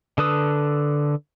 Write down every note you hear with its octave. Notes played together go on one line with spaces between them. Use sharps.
D3 A4 B4 D#6